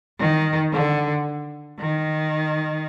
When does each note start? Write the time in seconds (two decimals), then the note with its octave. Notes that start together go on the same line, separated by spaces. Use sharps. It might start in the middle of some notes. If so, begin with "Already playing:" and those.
0.19 D#3
0.73 D3
1.79 D#3